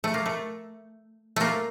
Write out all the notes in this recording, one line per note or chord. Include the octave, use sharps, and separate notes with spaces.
A3
A#3
A3
A3 A#3